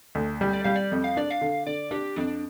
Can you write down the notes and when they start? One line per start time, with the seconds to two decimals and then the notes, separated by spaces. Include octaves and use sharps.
0.15 D2
0.41 G3
0.53 D5
0.64 G3 F5
0.76 D5
0.92 F2
1.04 F5
1.17 D4 D5
1.31 F5
1.41 D3
1.67 D3 D5
1.91 D4 G4
2.16 F2 D4